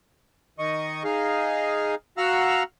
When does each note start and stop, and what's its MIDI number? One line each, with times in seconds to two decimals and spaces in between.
0.59 1.03 51
0.59 1.03 75
0.59 1.03 85
1.04 1.95 63
1.04 1.95 68
1.04 1.95 77
2.17 2.63 66
2.17 2.63 77
2.17 2.63 78
2.17 2.63 82
2.17 2.63 88
2.17 2.63 89